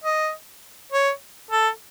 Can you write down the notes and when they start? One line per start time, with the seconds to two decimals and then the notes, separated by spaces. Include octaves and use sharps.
0.04 D#5
0.92 C#5
1.51 A4